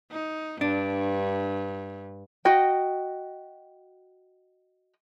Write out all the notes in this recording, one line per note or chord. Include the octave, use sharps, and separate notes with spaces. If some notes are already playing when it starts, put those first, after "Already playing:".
D#4
G2 D4
F#4 D#5 G5